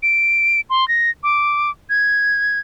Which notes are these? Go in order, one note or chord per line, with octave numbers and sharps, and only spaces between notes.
D7
C6
A#6
D6
G#6